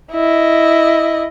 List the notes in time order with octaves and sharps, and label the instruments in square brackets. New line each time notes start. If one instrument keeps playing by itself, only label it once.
[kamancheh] E4 D#5